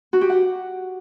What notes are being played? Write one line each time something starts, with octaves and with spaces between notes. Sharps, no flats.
F#4
G4
F#5